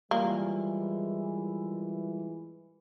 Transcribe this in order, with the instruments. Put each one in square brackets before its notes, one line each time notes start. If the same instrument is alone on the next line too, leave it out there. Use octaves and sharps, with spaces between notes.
[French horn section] E3 G#3 [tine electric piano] G3 F4 A#4 [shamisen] A#3